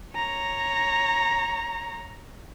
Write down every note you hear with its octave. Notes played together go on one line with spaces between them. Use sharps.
C#5 A#5